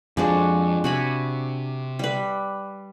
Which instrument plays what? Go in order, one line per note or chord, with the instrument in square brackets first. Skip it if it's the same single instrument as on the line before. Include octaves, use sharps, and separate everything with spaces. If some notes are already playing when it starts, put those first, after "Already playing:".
[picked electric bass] F2 F3 [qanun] G#3 D4 F#4
[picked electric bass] C3 [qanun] F#4 G#5 B5
[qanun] G3 B4